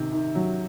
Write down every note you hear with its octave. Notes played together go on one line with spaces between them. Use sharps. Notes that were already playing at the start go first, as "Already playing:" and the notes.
Already playing: C3 D#3
D#3
F#3